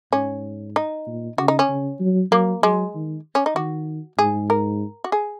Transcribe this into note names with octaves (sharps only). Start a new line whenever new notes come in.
G#2 C#4
D#4
A#2
C#3 F#4
D#4
C#4
C#3
F#3
F#3 A#3
F#3 G#3
D#3
C#4
D#4
D#3 F#4
G#2 G#4
A#4
F#4
G#4